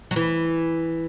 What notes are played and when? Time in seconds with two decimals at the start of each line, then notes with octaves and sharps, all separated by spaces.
0.11 F#3
0.16 E3